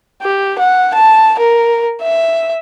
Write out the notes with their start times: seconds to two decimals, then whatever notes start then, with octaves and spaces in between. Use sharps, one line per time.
0.22 G4
0.59 F#5
0.94 A5
1.39 A#4
2.02 E5